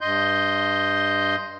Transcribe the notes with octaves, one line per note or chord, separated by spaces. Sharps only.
G2 D#5 C6 G6